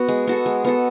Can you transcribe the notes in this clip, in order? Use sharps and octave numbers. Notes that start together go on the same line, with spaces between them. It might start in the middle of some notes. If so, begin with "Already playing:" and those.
Already playing: B3 F#4
G#3
B3 F#4 A4
G#3
B3 F#4 A4